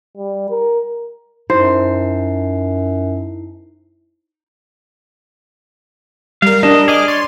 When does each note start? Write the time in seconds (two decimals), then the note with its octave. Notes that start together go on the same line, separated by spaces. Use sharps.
0.17 G3
0.50 A#4
1.50 F#2 D#4 E4 C5 C7
6.42 G3 A#4 F5
6.63 D4 D#5 E7
6.88 G#4 D#5 D6 F6
7.08 C#5 D5 C6